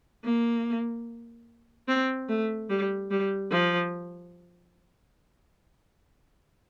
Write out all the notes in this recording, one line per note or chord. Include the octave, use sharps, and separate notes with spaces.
A#3
C4
A3
G3
G3
F3